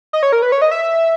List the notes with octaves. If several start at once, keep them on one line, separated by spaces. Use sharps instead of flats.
D#5
C#5
A#4
B4
C#5
D#5
E5